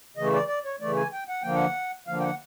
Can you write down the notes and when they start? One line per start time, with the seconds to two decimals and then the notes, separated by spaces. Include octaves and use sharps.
0.17 C#3 E3 A3 D#5
0.33 D5
0.48 D5
0.65 C#5
0.80 C#3 E3 A3 D5
0.96 G#5
1.13 G5
1.29 F#5
1.42 D3 F3 A#3 G5
1.55 F#5
2.07 D3 F3 A#3 F5
2.19 G5
2.24 F#5